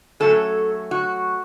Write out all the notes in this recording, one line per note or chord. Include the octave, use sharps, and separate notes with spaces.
F#3 A3 C#4 A4
F#4